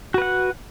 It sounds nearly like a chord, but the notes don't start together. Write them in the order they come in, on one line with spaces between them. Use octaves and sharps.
F#4 B4 F#5